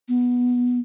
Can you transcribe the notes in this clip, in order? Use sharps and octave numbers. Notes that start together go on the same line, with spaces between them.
B3